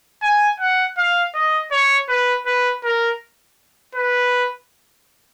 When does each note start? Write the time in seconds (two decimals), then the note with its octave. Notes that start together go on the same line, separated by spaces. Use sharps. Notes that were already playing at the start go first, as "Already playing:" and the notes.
0.23 G#5
0.60 F#5
0.98 F5
1.35 D#5
1.72 C#5
2.09 B4
2.46 B4
2.84 A#4
3.95 B4